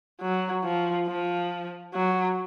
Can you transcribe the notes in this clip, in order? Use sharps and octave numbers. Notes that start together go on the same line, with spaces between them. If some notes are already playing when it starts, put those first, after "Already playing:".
F#3
F3
F3
F#3